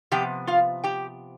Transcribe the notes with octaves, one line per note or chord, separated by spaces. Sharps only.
C3 F3 B3 G4 G5
F4 F5
G4 G5